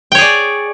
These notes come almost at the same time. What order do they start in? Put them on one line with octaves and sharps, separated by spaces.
G5 C#5 G#4 D5